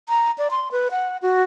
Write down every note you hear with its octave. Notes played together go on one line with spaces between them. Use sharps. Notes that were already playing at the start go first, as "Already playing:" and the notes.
A#5
D5
C6
B4
F#5
F#4